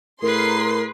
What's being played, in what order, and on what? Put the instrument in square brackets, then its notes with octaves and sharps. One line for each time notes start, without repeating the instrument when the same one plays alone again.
[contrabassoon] A2 [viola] G#4 B4 [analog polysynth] A#4 [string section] C6 C7